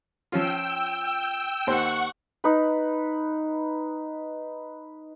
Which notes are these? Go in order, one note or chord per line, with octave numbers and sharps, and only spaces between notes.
F3 C#4 F4 G5 E6
D#2 C5 F#5 C#6
D#4 B4